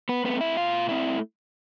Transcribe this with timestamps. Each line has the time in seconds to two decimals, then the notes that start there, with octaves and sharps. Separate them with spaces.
0.09 B3 B4
0.24 A3 B3 C4 B4
0.41 E4 E5
0.57 B2 F4 F5
0.89 A3 C4 E4 E5